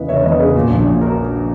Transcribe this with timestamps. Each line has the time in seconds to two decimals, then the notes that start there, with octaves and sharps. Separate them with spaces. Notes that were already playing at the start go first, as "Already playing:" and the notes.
Already playing: E2 C#3 E3 B4 D#5
0.09 E1 C#5 E5
0.24 E2 B4 D#5
0.39 C#3 G#4 B4
0.54 A#2 F#4
0.70 A#1
0.78 F#4
0.86 A#2
1.01 F#4 A#4